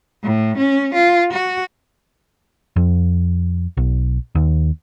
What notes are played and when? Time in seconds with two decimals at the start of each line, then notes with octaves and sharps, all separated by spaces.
0.23 A2
0.58 C#4
0.94 F4
1.33 F#4
2.76 F2
3.77 B1
4.35 D#2